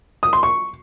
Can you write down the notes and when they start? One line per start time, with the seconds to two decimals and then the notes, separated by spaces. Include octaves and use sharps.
0.23 D#6
0.33 C6
0.43 C#6